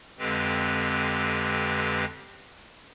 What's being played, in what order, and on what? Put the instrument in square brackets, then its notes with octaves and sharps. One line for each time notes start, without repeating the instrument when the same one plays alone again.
[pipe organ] F2 D3 G#3 C4 G4 B4